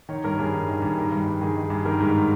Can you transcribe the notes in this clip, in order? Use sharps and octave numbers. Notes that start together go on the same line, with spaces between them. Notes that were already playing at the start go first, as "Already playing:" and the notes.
D#3 C#5
G2 A#4
G2 G#4
D#3
D#3
G2
D#3
G2
G2
D#3 G#4
D#3
G2
D#3 A#4
G#2